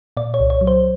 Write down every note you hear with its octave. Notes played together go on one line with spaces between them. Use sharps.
A#2 D5
C#5
C2
C#5
F#3
C5